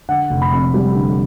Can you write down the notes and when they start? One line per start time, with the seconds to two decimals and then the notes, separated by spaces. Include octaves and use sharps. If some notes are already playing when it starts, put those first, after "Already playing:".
0.09 D3 F#5
0.30 F1
0.42 B5
0.52 F2
0.74 G3
0.95 D3